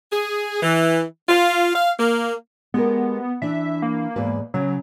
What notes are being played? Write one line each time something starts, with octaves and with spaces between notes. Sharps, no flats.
G#4
E3
F4
F5
A#3
G#3 B3 G4 A#4
E3 D4 E5
A#3
E2 G#2 B4
C#3 F#3